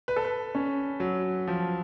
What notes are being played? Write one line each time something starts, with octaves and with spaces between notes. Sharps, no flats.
B4
A4
B4
C#4
F#3
F3